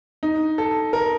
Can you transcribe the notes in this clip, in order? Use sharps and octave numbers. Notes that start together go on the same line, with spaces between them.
D#4
A4
A#4